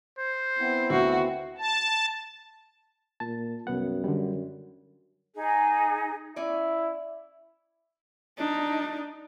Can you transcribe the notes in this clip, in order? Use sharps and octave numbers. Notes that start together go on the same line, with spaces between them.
C5
B3 C4 E4
D2 F#4 E5 C7
A5
A#2 A5
C2 F#2 B3 F#5
D3 G3
D#4 G#4
C#4 E4 D5
D4 D#4